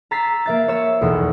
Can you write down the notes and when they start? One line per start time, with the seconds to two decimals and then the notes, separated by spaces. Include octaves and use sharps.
0.11 A#5 E6 A6 B6 C7
0.46 A#3 E5 A6
0.68 C#5 C#6 E6
1.01 B1 E2